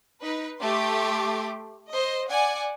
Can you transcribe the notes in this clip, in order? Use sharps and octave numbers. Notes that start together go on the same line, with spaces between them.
D#4 B4
A3 G4 C6 D6
C5 D#5
D5 F#5 G#5